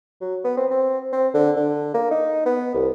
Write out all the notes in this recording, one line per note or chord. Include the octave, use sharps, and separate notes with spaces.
F#3
B3
C4
C4
C4
D3
D3
A#3
D#4
B3
C2